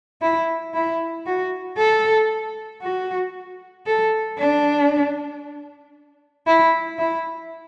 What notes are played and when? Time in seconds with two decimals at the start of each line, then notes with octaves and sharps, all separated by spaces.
0.22 E4
0.74 E4
1.26 F#4
1.78 A4
2.82 F#4
3.86 A4
4.38 D4
6.47 E4
6.98 E4